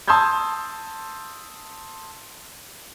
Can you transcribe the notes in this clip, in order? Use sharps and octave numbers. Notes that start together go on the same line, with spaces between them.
A5 C6 D#6 E6 G6 G#6